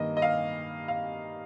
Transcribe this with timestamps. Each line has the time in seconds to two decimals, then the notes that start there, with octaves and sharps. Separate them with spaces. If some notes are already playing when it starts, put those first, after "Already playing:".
Already playing: G2 D#3 G3 A#3 D#5
0.17 D#5
0.22 F5
0.88 F5